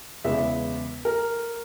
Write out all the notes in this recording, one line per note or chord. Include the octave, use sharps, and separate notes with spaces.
E2 C#3 E3 G#3 B3 E5
A#4